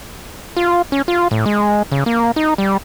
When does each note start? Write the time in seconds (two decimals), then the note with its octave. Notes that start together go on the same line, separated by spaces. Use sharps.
0.57 F4
0.92 C#4
1.08 F4
1.31 A2
1.46 G#3
1.92 C#3
2.06 A#3
2.36 D#4
2.58 G3